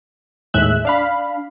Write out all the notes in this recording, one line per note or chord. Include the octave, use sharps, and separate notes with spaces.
D#2 A2 G#3 E5 F#6
D4 F5 B5